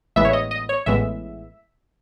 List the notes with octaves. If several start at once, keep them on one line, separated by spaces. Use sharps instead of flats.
A1 A2 E3 G#3 B3 E5
C#5
D#5
D#5
C#5
A1 A2 E3 G#3 B3 E5